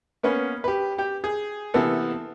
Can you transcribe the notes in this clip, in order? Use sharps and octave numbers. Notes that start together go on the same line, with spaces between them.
A#3 B3 C#4 B4
G4 B4
G4 G5
G#4
C3 E3 A#3 B3 A4